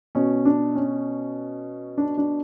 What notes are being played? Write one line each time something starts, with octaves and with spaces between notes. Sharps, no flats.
B2 C#4
D4
C#4
D4
D4